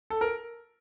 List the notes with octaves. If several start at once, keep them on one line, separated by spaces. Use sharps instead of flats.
A4
A#4